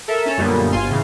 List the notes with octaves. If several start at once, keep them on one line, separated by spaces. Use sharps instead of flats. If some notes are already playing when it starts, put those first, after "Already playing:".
A4 A#4 E5
C#4 A4 C#5
F#2 A#2 D3 G3 A#3 B3
G1 F4 F5 G#5 C6
A2 C#3 E3 F5